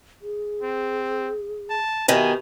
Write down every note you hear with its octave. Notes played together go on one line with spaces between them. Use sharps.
G#4
C4
A5
B2 D#3 G4 G#5